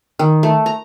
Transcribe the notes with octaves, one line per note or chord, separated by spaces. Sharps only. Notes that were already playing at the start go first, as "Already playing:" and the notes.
D#3
A3
A#5